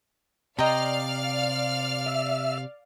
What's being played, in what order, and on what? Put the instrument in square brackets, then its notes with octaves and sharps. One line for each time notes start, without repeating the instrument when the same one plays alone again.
[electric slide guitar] C3 [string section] D5 F5 F6 [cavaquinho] D#5 G5 A#5
[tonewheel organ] E5